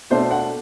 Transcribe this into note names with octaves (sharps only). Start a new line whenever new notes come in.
B2 A3 D4 C5
F#5